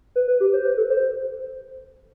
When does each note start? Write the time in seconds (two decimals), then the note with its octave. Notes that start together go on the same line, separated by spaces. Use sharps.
0.16 B4
0.28 B4
0.40 G4
0.53 C5
0.65 B4
0.77 A4
0.90 C5